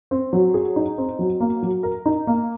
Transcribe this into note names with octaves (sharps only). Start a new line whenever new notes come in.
C4
F#3
G#4
D#4
C4
F#3
A#3
F#3
A#4
D#4
A#3